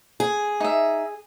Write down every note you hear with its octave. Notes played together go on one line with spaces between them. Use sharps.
G#4
D#4 E5